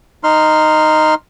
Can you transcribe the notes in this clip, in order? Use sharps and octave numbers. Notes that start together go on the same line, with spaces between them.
D#4 C6 F6